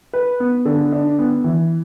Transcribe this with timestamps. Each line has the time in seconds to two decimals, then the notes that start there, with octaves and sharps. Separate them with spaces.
0.13 B4
0.40 B3
0.65 D3
0.92 D4
1.19 B3
1.44 E3